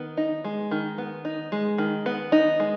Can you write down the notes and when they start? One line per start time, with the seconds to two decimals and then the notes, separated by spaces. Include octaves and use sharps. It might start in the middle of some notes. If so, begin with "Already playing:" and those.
Already playing: D#3 B3
0.17 D#4
0.44 G#3
0.71 D#3
0.98 B3
1.25 D#4
1.52 G#3
1.78 D#3
2.06 B3
2.32 D#4
2.60 G#3